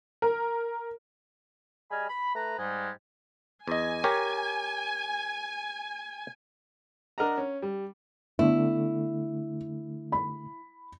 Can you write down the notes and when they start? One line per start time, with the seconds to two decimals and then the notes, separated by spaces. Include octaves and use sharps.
0.22 A#4
1.91 G3 G#4 D#5 G#5 B5 F6
2.09 B5
2.35 A3 B4 A#5
2.59 G#2 G3 G#3
3.68 E2 D#5 G#5
4.04 G4 A#4 C#5
7.18 D4 A#4 D#5 F#5 A#5
7.38 C#4
7.62 G3
8.39 D3 A3 B3 E4
10.12 B5